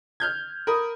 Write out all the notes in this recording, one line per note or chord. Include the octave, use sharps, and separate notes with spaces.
F6 G6 G#6
A#4 B5 D#6